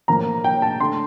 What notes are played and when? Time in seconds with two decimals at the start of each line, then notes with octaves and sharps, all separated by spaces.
0.08 A2 F3 A#3 A#5
0.44 G5
0.62 A5
0.80 D3 A3 C6